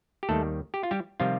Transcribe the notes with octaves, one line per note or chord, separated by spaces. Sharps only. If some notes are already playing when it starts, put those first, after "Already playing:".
G4
D#2 D#3 G3 A3 A4
G4
F4
G3 G4
C3 D#3 F3 G3 F4